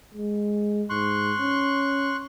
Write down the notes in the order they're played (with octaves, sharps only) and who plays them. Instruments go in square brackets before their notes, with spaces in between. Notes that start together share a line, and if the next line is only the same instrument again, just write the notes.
[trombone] G#3
[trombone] G#2 [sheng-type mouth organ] C6 C#6 F#6
[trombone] C#4